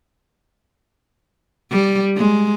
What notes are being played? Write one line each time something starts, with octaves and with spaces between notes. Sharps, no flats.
G3
G#3